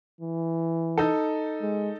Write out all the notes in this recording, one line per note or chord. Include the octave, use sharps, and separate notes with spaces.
E3
D#4 A4
G#3